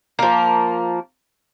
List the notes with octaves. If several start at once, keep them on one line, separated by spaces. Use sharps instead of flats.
F3 A#3